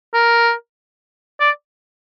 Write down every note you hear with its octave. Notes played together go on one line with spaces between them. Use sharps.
A#4
D5